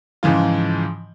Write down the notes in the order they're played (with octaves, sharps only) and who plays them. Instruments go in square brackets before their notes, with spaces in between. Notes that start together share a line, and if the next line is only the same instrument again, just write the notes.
[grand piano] G#2 C#3 E3 F3 F4